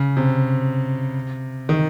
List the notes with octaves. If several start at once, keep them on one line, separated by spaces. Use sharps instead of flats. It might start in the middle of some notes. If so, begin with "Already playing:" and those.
Already playing: C#3
C3
D#3